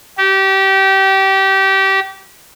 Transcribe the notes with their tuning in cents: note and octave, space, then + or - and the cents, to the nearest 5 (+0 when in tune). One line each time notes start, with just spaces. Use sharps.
G4 -25